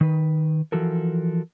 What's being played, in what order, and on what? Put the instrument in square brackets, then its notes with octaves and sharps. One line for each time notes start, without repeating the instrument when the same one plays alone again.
[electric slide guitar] D#3 B4
E3 F3 F#4 A4 A#4